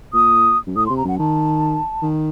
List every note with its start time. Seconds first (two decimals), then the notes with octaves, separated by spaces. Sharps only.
0.13 A#2 D#6
0.67 F#2
0.76 A2 D#6
0.86 C6
0.90 C3
0.97 A#5
1.04 F#2 F#5
1.19 D#3 A5
2.02 D#3